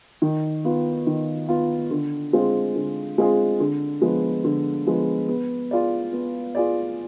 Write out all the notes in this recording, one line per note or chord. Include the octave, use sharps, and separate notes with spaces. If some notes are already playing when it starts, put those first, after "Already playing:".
D#3
B3 F4
D#3
B3 F4
D3
G#3 C4 F4 G#4
D3
G#3 C4 F4 G#4
D3
F3 G#3 B3
D3
F3 G#3 B3
B3
F4 G#4 D5
B3
F4 G#4 D5